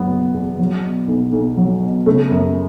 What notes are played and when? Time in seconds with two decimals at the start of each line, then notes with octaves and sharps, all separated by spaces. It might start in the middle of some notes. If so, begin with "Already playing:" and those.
Already playing: F#1 F#3 B3
0.10 B2
0.34 E2
0.59 F#3
0.84 B2
1.08 B1
1.32 B1
1.57 F#3
1.82 B2
2.06 C#3 A3
2.31 F#2